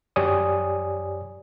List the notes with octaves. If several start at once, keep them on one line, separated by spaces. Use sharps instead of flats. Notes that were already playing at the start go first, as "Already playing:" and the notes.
F#2 G4 C#5 D5 G#5 D#6